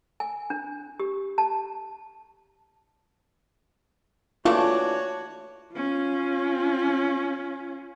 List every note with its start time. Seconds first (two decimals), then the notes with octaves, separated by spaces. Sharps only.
0.20 G#5
0.50 D4
1.00 G4
1.38 A5
4.45 E3 A3 D4 F4 F#4 C#5
5.74 C#4 F4